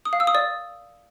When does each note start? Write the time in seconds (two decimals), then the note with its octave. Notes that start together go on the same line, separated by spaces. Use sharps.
0.05 D#6
0.13 F5
0.20 E6
0.27 D#6
0.35 D5